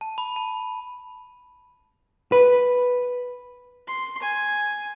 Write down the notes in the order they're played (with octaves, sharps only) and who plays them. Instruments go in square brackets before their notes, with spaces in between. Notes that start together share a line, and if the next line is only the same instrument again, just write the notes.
[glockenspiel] A5
B5
A5
[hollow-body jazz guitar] B4
[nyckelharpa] C6
G#5